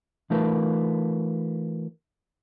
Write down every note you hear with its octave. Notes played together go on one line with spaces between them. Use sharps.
E3 A3 D#4 F4 A#4 B4